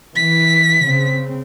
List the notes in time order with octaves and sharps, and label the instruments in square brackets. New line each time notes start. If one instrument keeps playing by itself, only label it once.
[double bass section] E3 [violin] B6
[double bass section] C#3 C4